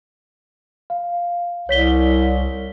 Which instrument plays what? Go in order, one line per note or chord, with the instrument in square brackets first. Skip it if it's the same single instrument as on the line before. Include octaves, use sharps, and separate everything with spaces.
[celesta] F5
[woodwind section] C2 [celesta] C#5 B6 G7